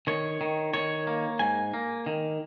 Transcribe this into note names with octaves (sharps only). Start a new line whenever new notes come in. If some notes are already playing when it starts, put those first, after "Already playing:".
D#3 C#5
D#3
D#3 C#5
A#3
G#2 G#5
A#3
D#3